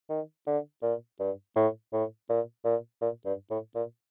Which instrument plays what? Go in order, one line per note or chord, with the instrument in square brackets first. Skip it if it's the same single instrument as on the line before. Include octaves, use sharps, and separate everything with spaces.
[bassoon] D#3
D3
A#2
G2
A2
A2
A#2
A#2
A#2
G2
A2
A#2